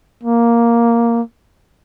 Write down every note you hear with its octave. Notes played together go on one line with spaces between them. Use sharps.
A#3